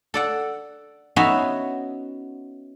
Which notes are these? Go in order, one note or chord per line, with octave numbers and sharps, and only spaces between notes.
A4 D5 F#5
B3 C#4 D#4 F#4 C#5 E5